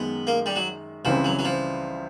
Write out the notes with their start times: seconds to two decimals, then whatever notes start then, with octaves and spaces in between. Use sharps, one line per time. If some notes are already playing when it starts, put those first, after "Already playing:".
Already playing: F#2 D#3 G#3 B3
0.27 A#3
0.46 G3
0.56 F#3
1.05 C#2 C#3 E3 F3 G3 C4
1.24 F#3
1.39 F#3
1.45 F3